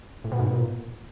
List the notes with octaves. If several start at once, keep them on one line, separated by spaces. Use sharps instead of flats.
A2
B2
G#2
B2
A#2